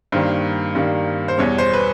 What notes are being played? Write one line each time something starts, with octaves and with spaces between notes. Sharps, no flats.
G2 D#3 G3 A#3 C5
G2 D#3 G3 A#3
C5
E2 B2 G3 C#5
C5
B4